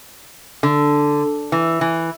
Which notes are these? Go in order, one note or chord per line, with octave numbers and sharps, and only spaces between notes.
D3
E3
E3